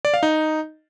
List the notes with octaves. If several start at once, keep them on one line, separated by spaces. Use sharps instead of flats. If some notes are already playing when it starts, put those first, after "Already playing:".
D5
F5
D#4